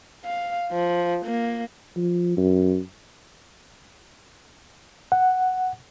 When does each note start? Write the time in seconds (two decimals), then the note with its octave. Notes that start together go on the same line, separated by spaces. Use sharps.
0.25 F5
0.72 F3
1.26 A#3
1.96 F3
2.37 F#2
5.12 F#5